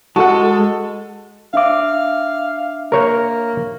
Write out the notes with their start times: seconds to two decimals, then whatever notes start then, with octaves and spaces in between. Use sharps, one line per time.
0.16 G#3 F#4 A4 F#5 A5
1.54 D4 E5 F5 D6
2.92 A#3 A#4 C#5